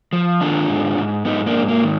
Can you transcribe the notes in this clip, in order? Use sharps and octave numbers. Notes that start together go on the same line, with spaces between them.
F3
D#3 D4 F4
G#2
G#2
G#2 B3 D#4
A#3 D4
G#2
A#3
D#3